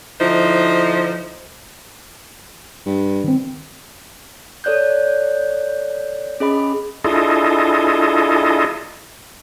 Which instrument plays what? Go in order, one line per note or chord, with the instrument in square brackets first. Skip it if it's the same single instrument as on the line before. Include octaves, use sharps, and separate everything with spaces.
[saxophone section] D3 F3 D#4 E4 C5
[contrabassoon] G2
[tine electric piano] D#3 C4
[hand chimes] A4 C#5 D5 F#6 G6
C#4 G#4 D#5 B5
[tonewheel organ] D4 E4 F4 G#4 A4 D#5